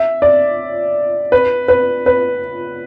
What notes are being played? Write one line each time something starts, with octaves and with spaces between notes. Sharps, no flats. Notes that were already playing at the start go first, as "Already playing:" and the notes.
Already playing: E5
D5
B4
B4
B4